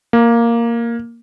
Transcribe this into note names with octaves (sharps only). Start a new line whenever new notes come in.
A#3